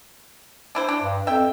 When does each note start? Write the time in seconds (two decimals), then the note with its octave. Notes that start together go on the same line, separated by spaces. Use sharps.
0.75 D4 E4 C5
0.89 D4
1.02 G2
1.27 F2 E5 G5